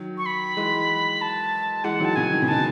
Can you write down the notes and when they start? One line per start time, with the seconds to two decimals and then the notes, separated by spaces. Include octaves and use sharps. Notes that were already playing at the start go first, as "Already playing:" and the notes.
Already playing: D#3 F#3
0.18 C#6
0.26 B5
0.57 E3 G#3
1.22 A5
1.84 E3 G#3 F#5
2.00 D#3 F#3 A5
2.16 C#3 E3 G#5
2.33 D#3
2.42 C#3
2.48 B2 D#3 A5